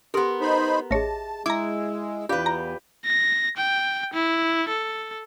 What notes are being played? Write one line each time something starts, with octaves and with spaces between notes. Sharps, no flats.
B3 G4 A4 A#4 C6
D#4 C5 B5
A1 G#4 C#5 D#5 E5 A5
G#3 E4 A#5 D6
E2 F4 G4 B4 D5 F5
F4 A#5
A#6
G5
E4
A4